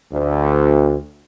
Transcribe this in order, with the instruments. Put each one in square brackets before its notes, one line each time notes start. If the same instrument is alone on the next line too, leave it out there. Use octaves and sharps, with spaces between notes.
[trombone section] D2